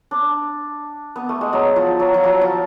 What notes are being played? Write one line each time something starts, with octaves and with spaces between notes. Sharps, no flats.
D4
B3
A3
G#3
F#3
F3
F#3
F3
F#3
F3